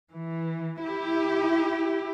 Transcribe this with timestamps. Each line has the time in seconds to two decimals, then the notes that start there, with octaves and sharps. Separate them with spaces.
0.14 E3
0.81 E4 G4